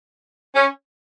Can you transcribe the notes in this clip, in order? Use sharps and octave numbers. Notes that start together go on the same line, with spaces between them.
C#4